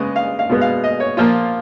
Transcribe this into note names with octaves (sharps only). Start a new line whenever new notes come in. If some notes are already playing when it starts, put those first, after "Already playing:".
Already playing: C#3 G#3 B3 D#5
F5
F5
B2 G#3 B3
F5
D#5
C#5
A#2 F3 A#3 F4